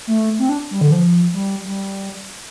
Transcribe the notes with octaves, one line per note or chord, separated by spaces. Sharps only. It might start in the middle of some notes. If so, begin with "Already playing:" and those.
A3
C4
D4
G3
D3
F3
G3
G3